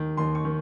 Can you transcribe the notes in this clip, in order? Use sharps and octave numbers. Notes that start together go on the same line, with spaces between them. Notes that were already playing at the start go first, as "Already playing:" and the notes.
Already playing: D#2 D#3
D#2 C6
C#6
D#3